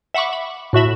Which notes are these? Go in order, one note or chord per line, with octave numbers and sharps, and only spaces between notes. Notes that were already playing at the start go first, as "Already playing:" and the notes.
E5 F#5 B5 C#6 D6
B5
A2 F#4 E5 B5